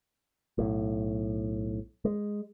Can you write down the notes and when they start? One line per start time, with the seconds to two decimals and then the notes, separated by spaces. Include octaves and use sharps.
0.58 B1 A2
2.05 G#3